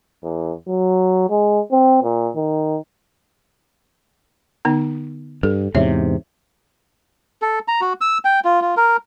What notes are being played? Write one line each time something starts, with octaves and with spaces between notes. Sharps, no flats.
E2
F#3
G#3
C4
A#2
D#3
D3 B3 D#4
G2 A4
E2 G#2 C3 C#5 E5
A4
A#5
F#4
E6
G5
F4
F4
A#4